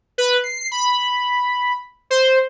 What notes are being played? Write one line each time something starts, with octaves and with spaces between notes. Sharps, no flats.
B4
C7
B5
C5